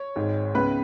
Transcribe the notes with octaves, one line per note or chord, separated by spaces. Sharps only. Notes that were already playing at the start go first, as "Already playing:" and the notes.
Already playing: C#5
G#1 G#2 G#3
C#2 C#3 G#3 B3 B4